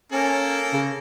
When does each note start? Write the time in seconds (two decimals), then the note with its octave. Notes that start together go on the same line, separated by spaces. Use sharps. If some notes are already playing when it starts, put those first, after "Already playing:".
0.12 A#3 C#4 A4 A#4
0.73 C#3